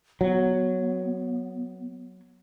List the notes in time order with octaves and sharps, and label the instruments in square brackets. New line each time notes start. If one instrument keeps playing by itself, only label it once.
[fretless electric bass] F#3 [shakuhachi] B3